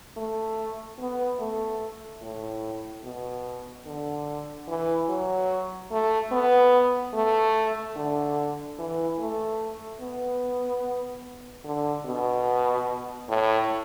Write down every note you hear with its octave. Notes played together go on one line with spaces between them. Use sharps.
A3
B3
A3
A2
B2
D3
E3
F#3
A3
B3
A3
D3
E3
A3
B3
D3
B2
A2